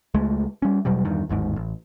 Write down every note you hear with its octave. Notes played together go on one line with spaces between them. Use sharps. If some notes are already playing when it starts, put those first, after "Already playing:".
C#2 G#3 A3
G3 C#4
E1 B2 F#3 G3
E2 G2 D#3
G1 D#2 G#2
A1